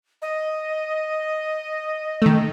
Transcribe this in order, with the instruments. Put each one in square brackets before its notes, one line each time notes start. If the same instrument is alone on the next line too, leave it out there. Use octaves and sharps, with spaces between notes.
[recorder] D#5
[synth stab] D#3 A3